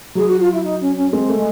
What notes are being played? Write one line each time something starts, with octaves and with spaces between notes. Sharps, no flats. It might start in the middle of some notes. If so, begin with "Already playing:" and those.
F#3 G#4
F#4
F4
E4
D#4
C#4
C#4
G#3 C4
A3
G#3